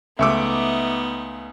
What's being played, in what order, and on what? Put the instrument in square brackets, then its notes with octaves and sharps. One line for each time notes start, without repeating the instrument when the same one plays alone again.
[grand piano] C#2 A3 E6 [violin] B3 D#4 [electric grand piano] E5 D6